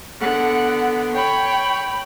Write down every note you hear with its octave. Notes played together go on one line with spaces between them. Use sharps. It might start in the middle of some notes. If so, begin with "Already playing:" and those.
D3 B3 F#5
C#5 G5 B5